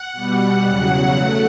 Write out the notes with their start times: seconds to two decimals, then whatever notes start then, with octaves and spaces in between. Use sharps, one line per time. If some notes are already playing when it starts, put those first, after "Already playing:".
Already playing: F#5
0.13 B2 G3
0.65 E2 C#3 F#3 F#5
1.17 A3